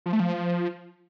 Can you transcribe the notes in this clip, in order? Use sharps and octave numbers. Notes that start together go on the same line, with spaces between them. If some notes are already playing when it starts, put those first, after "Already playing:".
F3
A3
F3